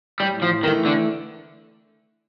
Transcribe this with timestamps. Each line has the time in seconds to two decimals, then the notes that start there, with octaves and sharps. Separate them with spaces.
0.20 A2 G3
0.42 F3
0.63 D#3 E3 A3
0.85 D3